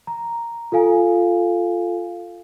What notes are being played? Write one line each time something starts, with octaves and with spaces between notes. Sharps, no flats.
A#5
F4 A4 F5 G#5